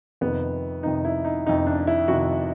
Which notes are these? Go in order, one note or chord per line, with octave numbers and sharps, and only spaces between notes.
F2 C3 D#3 B3
F2 C3 D#3 D#4
E4
D#4
F2 C3 D#3 D#4
D4
E4
F2 C3 D#3 F#4